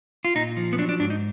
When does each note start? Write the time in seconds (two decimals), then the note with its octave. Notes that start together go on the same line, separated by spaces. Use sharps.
0.25 F4
0.35 A#2 D#4
0.57 F3
0.73 B3
0.78 F#3 D4
0.89 D4
1.00 G#2 D4
1.10 D#4